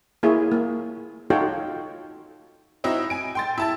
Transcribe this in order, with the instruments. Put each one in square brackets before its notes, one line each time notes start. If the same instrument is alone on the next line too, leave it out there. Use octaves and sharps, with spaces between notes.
[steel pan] A#3 E4 F4 G#4 C#5
A#3
D#4 F4 F#4 A4 C#5 G5
[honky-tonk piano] C4 D#4 E4 F#4
G#5 D7
G5 C6 A6
E4 A5 A6